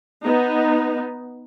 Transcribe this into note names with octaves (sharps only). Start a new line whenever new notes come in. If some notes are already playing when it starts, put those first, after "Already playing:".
B3 D#4